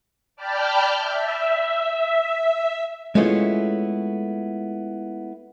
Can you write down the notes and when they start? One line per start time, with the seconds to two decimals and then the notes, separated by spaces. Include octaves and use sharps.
0.36 D5 G5 A5 B5 F6 G6
0.95 E5
3.15 G#3 A3 B3 C#4 E4 F4